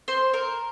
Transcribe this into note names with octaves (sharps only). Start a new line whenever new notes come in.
C5
A#4